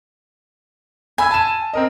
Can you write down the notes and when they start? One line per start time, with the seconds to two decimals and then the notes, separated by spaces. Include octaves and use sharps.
1.18 G#5 B5 E6 G#6
1.31 A5 E7
1.73 C4 A#4 D#5